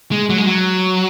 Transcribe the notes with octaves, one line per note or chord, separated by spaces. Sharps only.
G#3
F#3
G#3
F#3